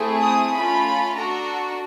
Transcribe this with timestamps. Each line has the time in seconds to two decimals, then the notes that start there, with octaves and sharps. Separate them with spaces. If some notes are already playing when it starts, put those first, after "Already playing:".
Already playing: A3 C4 E4 G#4
0.21 D#6
0.52 A3 C#4 F4 B5
1.15 D4 F#4 A4 A#5